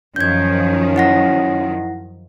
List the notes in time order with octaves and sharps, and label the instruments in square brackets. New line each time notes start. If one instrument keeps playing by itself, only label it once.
[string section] F#2 D#3 F3 [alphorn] C#4 [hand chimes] G6 G#6
[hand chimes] E4 F#5 A#6